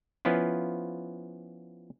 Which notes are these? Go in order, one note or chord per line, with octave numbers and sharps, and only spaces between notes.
F3 B3 C#4 E4 F4